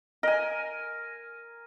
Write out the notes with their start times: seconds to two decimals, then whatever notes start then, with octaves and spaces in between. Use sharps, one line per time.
0.23 A#4 D#5 G#5